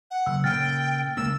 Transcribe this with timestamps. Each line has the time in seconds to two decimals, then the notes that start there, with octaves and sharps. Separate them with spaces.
0.11 F#5
0.26 F#1 E6
0.44 A#2 C#3 G5 F6 A6
1.17 C#2 A#3 E6